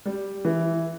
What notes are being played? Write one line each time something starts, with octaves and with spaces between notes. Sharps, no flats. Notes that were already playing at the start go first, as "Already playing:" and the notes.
G3
E3